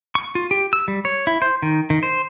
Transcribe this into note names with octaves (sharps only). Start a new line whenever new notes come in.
C#6
F4
G4
E6
G3
C#5
E4
C5
D#3
D#3
C5